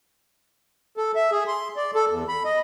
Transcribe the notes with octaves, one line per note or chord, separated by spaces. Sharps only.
A4
E5
G#4
C6
D5
A4
E2
B5
D#5